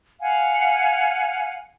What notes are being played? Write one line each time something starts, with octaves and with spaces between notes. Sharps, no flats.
F5 F#5 G#5